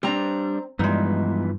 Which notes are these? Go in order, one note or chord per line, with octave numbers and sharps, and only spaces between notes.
G3 C4 D4 A#5
G2 E3 F3 G#3 B3 D#4